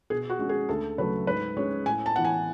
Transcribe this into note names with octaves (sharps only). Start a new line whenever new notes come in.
B2 G#4
F#4
G#3 C#4
G#4
D2 A4
C#3 F#3 A3 B4
G#2 B4
G#3 C#4 C#5
A2 G#5
A5
E3 B3 F#5
G#5